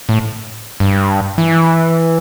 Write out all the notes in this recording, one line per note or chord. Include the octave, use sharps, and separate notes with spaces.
A2
G2
E3